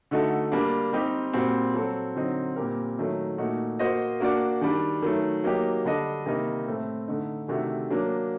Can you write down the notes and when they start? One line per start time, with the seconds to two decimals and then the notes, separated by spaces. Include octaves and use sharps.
0.11 D3 A3 D#4 F#4 A4
0.52 G3 A#3 D4
0.93 G3 C4 D#4 G4
1.33 A#2 G3 C4 F#4
1.74 F#3 C4 F#4 A4
2.16 D3 F#3 C4 D#4
2.56 A#2 G3 C4 G4 A#4
2.98 D#3 F#3 A3 D#4
3.38 A#2 A3 D#4 F#4
3.79 A#3 F#4 C5 D#5
4.20 A#3 D4 F#4 A#4 D5
4.61 D#3 G3 D4
5.02 D#3 F#3 A3
5.44 F#3 A#3 D#4 G4
5.85 D3 G3 D4 A4 D#5
6.26 C3 D#3 G3 A#3 D#4
6.67 A2 A3 C4
7.08 D3 A3 D#4
7.48 C3 D#3 A3 D4 F#4
7.90 F#3 A#3 D4